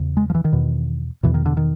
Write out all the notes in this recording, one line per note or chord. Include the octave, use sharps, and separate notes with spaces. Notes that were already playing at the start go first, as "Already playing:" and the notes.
Already playing: E2 C#3
G#3
F3
E3
D#3
E2 B2
E2 B2 E3
D#3
D3
D#3